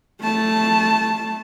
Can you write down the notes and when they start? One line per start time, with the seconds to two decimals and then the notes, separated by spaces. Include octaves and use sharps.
0.22 A3 A5